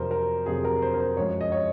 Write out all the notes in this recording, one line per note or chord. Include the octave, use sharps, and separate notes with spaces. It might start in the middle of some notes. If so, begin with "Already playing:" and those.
Already playing: F2 C3 F#3 A#4 C5
A#4
F2 C3 F#3 G#4
A#4
C5
A#4
C5
F#2 F3 G#3 C#5
D#5
C#5